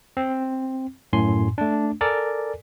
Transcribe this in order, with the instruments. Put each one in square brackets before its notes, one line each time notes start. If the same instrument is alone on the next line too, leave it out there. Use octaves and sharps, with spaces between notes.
[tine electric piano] C4
F#2 A2 G#5 C6
A3 D4
A4 A#4 D5 G#5